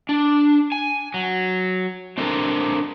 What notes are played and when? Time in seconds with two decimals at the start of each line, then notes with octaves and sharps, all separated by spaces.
0.09 D4
0.72 G#5
1.14 F#3
2.18 C4 D4 A4 A#4